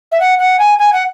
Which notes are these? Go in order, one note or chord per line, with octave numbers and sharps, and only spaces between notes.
E5
F#5
F#5
G#5
G#5
F#5